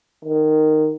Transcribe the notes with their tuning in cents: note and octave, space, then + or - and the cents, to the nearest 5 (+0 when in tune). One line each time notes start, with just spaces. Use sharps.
D#3 -10